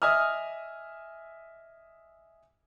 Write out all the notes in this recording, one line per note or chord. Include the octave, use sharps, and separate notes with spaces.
D#5 E5 G#5 D#6 F6